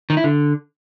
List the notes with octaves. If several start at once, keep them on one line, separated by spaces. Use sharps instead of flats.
D#3
E4
D3